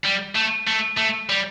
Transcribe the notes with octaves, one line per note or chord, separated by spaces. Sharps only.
G3
A3
A3
A3
G3